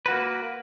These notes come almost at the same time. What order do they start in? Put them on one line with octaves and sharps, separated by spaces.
B4 F#4 A#3